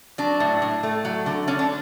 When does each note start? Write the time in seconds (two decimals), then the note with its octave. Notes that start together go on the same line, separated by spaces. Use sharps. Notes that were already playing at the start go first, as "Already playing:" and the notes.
0.18 F#3 D4
0.40 A2
0.62 A2
0.83 A3
1.05 F#3
1.26 D3
1.48 D3 C#4
1.59 D4